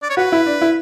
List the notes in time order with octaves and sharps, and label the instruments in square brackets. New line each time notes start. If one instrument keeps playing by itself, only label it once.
[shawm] D5
C#5
[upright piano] F#4 [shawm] B4
[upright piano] E4
D4
E4